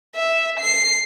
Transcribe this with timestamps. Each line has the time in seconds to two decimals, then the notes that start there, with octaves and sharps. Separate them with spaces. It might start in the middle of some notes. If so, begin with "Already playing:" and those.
0.15 E5
0.60 C7